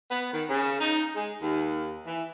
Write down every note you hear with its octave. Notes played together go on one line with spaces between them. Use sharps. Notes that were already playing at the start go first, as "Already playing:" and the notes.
B3
D#3
C#3
D#4
G#3
D#2
E3